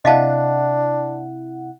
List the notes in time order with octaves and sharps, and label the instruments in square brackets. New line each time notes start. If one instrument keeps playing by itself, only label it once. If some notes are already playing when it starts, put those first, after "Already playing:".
[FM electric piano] C3 E4 F#5 [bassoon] D4 [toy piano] D#5 F5 A5